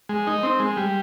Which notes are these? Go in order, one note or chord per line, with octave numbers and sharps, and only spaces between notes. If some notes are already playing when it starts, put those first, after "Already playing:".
G#3
D#4
C4
G#3
G3